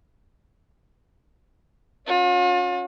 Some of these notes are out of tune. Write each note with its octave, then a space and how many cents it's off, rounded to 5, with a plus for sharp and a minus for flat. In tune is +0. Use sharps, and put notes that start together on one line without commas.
C#4 +0 F4 +45